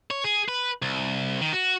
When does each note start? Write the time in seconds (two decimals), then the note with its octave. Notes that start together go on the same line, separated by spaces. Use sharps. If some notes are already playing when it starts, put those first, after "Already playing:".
0.11 C#5
0.24 G#4
0.48 B4
0.82 C2
1.41 D#3
1.53 F#4